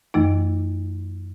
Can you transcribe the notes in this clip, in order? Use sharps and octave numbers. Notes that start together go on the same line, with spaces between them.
F#2 E3 A3 D#4